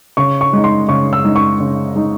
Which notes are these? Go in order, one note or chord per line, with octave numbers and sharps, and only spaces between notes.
C#3 C#6
C#6
G#3 D#4
C6
C#3 C#6
E6
G#3 D#4
C#6
C#3
G#3 D#4